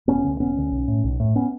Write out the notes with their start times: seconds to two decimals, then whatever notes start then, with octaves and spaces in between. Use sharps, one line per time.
0.08 E1 B3 C#4
0.24 D2 D3
0.40 E1 B3 C#4
0.56 D2 D3
0.71 B1
0.88 A2
1.04 B1
1.20 A2
1.36 B3 C#4